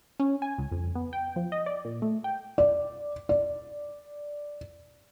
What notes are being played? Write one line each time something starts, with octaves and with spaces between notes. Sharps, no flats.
C#4
G#5
C#2
F2
B3
G5
F3
D#5
D5
A#2
A3
G5
D5
D5